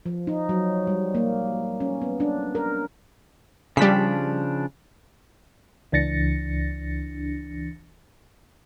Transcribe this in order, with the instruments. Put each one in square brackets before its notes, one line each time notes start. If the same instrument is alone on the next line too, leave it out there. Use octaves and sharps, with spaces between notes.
[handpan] F3
D#4
F#3
G3
A#3
C#4
B3
D4
A#4
[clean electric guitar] C#3 F3 D4 [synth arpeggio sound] G3 B6
[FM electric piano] C#2 E3 D4 A6 A#6 C#7